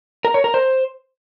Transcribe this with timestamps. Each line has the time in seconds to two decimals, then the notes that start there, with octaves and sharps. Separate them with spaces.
0.25 A#4
0.34 C#5
0.44 A#4
0.54 C5